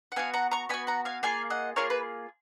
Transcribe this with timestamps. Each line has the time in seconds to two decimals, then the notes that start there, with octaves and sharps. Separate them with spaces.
0.12 F#5
0.16 B3 F#4 F5 G#5
0.34 F#5 A#5
0.51 A#5 C#6
0.69 B3 F#4 G#5 B5
0.87 F#5 A#5
1.05 F5 G#5
1.23 A#3 F4 G#4 F5 G#5
1.50 D#5 F#5
1.76 A#3 F4 G#4 A#4 C#5
1.90 B4